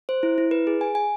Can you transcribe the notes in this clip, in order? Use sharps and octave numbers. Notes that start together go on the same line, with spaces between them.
C5
E4
E4
B4
G#4
G#5
G#5